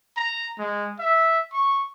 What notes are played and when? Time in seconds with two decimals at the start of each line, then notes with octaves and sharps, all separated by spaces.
0.17 A#5
0.58 G#3
0.99 E5
1.53 C#6